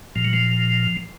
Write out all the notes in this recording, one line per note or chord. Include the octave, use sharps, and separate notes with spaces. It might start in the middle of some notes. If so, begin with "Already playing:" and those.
A#2 F3
F#3
F3